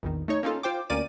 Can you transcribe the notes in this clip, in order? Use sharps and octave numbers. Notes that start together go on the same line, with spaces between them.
A#1 E2 D#3
A3 D#4 C#5
A#3 C#4 D#4 F4 A4
F4 C5 G5 D6
D2 A#3 C#4 D5 D6 D#7